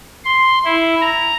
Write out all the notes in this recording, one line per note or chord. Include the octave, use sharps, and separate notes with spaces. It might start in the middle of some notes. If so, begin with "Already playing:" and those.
C6
E4
A#5